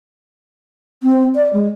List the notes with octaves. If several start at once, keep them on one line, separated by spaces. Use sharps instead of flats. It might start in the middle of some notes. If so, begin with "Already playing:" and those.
C4
D5
G#3